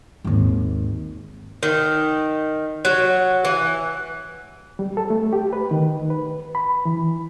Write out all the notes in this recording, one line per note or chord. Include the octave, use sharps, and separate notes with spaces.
G#1 D#2
D#3
F#3
E3
G3
A4
A3
G4
B4
D#3
B4
B5
E3